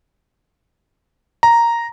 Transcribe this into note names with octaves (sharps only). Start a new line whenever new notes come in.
A#5